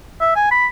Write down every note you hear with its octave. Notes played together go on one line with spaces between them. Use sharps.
E5
G#5
B5